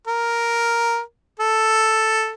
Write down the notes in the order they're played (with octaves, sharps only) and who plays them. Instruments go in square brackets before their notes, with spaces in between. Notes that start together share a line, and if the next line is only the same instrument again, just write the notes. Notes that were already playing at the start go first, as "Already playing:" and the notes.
[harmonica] A#4
A4